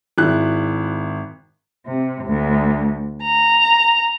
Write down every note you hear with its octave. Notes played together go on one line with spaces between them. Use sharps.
G#1 E4 F#6
C3
D2
A#5